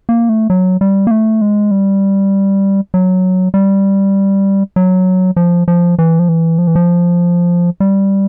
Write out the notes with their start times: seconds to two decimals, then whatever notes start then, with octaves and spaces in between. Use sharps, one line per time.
0.09 A#3
0.29 A3
0.50 F#3
0.81 G3
1.07 A#3
1.11 A3
1.41 G#3
1.71 G3
2.94 F#3
3.54 G3
4.76 F#3
5.36 F3
5.68 F3
5.99 E3
6.19 F3
6.29 E3
6.58 F3
6.67 E3
6.75 F3
7.80 G3